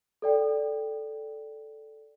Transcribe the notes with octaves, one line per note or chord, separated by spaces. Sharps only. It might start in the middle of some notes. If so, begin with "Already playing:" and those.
A4 D5 G5